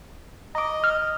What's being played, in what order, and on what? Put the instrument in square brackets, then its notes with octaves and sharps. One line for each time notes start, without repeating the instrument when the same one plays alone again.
[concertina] D#5 [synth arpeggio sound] A#5 D6
[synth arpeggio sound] F6